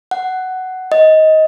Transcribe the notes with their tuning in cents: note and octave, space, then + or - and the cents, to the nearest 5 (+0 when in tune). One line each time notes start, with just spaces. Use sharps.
F#5 +10
D#5 +15